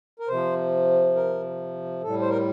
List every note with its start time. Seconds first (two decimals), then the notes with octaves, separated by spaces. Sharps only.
0.19 A#4
0.28 C3 F3 C5
1.16 A#4
2.02 A2 G3 A4
2.21 C5
2.30 A#4